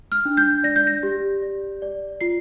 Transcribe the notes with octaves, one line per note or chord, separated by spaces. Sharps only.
F6
D4
G6
D5 A#6
G6
A#6
G4
D5
D5
F4 C7